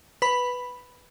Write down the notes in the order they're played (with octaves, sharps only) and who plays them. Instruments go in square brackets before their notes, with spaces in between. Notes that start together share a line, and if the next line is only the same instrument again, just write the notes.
[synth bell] B4 B5